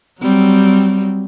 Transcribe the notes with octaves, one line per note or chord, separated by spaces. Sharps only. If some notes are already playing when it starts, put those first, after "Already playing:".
F#3 G3 C4